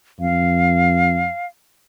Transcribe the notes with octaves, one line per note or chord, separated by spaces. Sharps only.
F2 F5